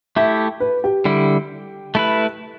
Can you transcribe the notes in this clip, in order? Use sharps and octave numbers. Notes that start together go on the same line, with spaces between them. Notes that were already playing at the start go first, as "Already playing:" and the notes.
A3 E4 G4 E5
B4
G4
D3 G3 E4
A3 E4 B4